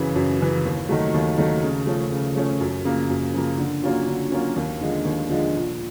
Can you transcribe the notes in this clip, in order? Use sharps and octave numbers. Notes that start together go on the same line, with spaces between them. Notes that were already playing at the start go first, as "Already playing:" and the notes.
Already playing: F#2 C#3 E3
F#2
C#3 E3
D#2
D#3 F#3 A3
D#2
D#3 F#3 A3
C#3
F3 A3 C#4
C#3
F3 A3 C#4
F#2
C#3 F3 A#3
F#2
C#3 F3 A#3
D3
F#3 A#3 C#4 F4
D3
F#3 A#3 C#4 F4
D#2
D3 F3 G#3
D#2
D3 F3 G#3
A#2